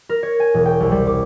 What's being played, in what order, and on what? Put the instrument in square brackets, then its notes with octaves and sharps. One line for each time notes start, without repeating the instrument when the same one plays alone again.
[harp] A#4
C#5
G#5
E1
G5
C2
G3
D6